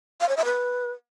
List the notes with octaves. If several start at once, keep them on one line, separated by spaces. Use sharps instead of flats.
F5
C#5
E5
B4